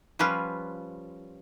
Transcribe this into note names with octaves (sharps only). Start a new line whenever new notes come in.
F3 G3 C#4 F4 B4